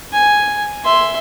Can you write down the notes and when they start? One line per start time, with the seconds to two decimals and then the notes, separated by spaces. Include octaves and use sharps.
0.13 G#5
0.85 E5 C6